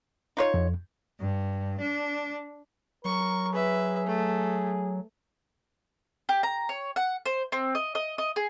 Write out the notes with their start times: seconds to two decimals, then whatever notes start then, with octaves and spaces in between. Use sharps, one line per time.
0.37 D#4 F4 C#5
0.54 F2
1.20 G2
1.80 D4
3.05 F#3 A#4 C#6
3.53 G#4 B4 E5
4.06 A3
6.29 G4
6.43 A#5
6.69 C#5
6.96 F#5
7.26 C5
7.52 C4
7.75 D#5
7.95 D#5
8.18 D#5
8.36 G#4